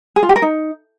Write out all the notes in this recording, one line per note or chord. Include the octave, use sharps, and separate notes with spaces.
G#4
F4
G4
A#4
D#4